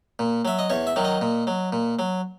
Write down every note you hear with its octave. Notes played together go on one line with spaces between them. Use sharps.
A#2
F#3 E5
D#5
E2 C#5
E5
D#3 F#3
D#5
A#2
F#3
A#2
F#3